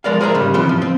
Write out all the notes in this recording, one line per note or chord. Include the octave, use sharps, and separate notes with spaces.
F3 G#3 A#4 D5 F5
G#4 A#4 C5 D5 E5 A#5
C#2 G#2 C#3 G3
D#2 C#3 E3 F3 C4
G#2 F3
C4